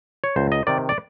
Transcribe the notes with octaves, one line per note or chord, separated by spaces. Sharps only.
C#5
C#2 C5
D#5
C3 D#3 D5
D5